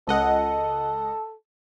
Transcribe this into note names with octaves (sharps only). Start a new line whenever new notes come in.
C#2 A4 D#5 F#5